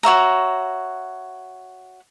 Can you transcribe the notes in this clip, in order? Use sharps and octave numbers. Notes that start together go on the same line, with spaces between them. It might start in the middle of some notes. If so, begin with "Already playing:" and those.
F#4 C#5 E5 A#5